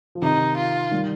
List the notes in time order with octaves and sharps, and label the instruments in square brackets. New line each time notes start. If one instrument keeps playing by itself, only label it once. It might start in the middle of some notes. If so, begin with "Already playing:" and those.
[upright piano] F3
[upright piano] C3 D#3 [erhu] D#4
[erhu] F4
[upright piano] D#3 G3